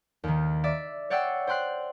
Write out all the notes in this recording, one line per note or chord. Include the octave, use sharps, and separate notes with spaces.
D#2 D#3
D5 E5 D6
C#5 D5 F#5 G5 E6 C7
C5 G5 C6 F#6 C7